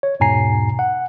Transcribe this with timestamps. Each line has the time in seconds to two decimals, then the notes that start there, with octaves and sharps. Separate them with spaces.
0.03 C#5
0.20 E2 G#2 B2 G#5 A#5 C7
0.79 F#5